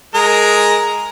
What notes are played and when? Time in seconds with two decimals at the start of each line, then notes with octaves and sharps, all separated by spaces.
0.14 G#3 A#4